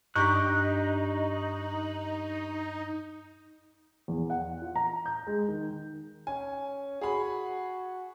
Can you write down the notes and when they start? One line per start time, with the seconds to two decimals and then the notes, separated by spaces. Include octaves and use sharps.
0.16 G2 D#4 G4 A#5 C#6 F#6 G6 B6
4.08 E2
4.30 F#5
4.62 F4
4.76 A#5
5.06 G6
5.27 G#3
5.48 D#3
6.27 C#4 G#5
7.01 F#4 G#4 B5